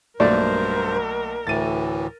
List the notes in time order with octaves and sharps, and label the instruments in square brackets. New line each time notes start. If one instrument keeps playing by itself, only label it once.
[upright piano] B1 A3 A#3 [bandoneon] G2 C5 [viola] A#4 [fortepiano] D5
[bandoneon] D2 A2 E3 [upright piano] A6 D#7